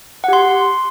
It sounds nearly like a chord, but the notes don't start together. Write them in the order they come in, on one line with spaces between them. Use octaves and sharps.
F#5 G4 C6